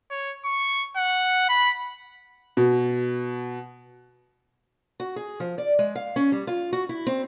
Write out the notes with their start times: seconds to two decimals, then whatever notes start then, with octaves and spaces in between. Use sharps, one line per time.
0.10 C#5
0.45 C#6
0.97 F#5
1.49 B5
2.57 B2
5.00 F#4
5.16 G#4
5.40 F3
5.58 D5
5.79 G#3
5.95 F5
6.16 C#4
6.32 G3
6.47 F4
6.73 F#4
6.89 E4
7.07 C4